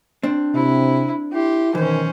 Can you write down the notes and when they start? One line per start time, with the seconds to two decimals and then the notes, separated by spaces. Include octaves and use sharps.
0.23 C4 D4
0.54 C3 E4
1.33 E4 G4 C6
1.75 B1 D#3 E3 C#4 C5